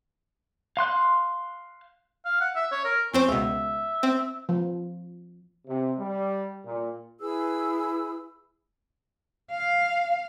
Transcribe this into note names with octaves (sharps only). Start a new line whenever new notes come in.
F5 C6 F#6
F5
F#5
E5
C#5
A#4
F2 C4 C#4 C5
C#2 B2 E5
C4
F3
C3
G3
A#2
E4 G#4 B4 E6
F5